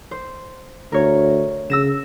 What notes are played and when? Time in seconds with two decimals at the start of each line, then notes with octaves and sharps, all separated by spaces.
0.11 C5
0.92 D2 A#4 C#5
1.70 C#3 E6 A#6 E7